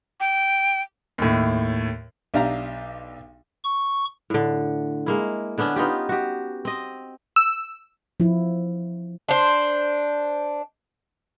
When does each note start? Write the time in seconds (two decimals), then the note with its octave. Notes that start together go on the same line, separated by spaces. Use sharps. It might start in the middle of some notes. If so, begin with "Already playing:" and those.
0.20 G5
1.18 D#2 A2
2.34 B1 D4 G4 E5 F5 A#5
3.64 C#6
4.30 A2 D3
5.06 G#3 A#3 E4
5.58 D3 B3 C#4 D4
5.76 B3 D#4 F4 G4
6.09 F#4 G4
6.65 C4 D#5
7.36 E6
8.20 F3 E4
9.29 D4 C5